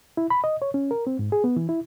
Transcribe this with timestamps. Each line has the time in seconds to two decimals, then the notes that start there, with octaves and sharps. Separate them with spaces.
0.17 E4
0.30 B5
0.44 D#5
0.62 C#5
0.74 C#4
0.91 A#4
1.07 C4
1.19 G#2
1.32 G#4
1.44 B3
1.57 E3
1.69 E4